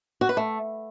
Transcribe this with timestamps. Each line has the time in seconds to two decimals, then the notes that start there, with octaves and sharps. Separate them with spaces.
0.21 F#4
0.29 B4
0.37 A3